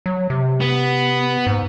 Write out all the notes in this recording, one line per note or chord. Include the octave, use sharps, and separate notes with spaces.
F#3
C3
B3
G#2